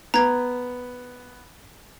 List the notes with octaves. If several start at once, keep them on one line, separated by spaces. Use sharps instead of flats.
B3 A#5 G#6